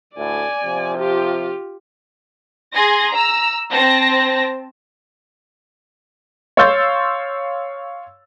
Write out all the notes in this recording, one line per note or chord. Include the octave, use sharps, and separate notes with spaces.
D2 A2 D5 G#5
C3 F3
F4 G4
G#4 G#5 C6 A#6
A#5 E6
C4 A5 A#6
C#5 F5 C6 E6 G6 A6